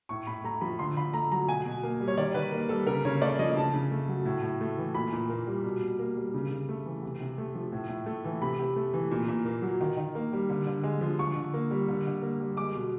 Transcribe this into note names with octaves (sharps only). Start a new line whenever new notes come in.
A2 C#6
A2 B5
A3 A#5
F3 B5
D3 C6
D3 B5
A3 A#5
F#3 A#5
B2 G#5
B2
A#3
G3
C#5
D#3 D5
D#3 B4
A#3
G3 A4
C#3 A#4
C#3 C#5
A3 D5
F3 D#5
C#3 A5
C#3
A3
F#3
A2
A2
A3
E3
A#2 B5
A#2
A#3
G3
B2
B2
A#3
G3
C#3
C#3
A3
E3
C3
C3
A3
F3
A2
A2
A3
E3
C3 B5
C3
A3
E3
A#2
A#2
A#3
F#3
D#3
D#3
A#3
G3
D3
D3
G#3
F3
D3 C#6
D3
A#3
G3
D3
D3
A#3
G3
G#3 D6
B2